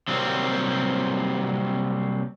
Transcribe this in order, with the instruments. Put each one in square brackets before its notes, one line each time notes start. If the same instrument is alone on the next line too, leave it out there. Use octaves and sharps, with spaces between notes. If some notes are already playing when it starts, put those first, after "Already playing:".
[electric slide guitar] C3 F#3 G3 A#3 C4